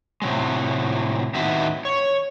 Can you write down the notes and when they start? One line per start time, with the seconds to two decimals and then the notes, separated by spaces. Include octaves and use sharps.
0.22 A2 C3 F#3 G#3
1.35 A2 D#3 B3 F#4 E5
1.85 C#5